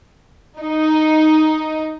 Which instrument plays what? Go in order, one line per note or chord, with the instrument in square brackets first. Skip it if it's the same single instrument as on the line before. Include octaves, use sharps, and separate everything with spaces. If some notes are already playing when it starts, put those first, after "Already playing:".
[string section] D#4